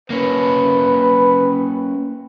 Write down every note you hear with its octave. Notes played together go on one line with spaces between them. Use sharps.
A#3 C#4 B4